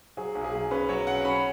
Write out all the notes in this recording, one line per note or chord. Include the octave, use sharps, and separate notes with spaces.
F#3 G#4
B1
G#4
B1
C#4 B4
F#3 C#5
C#4 F#5
C#4 B5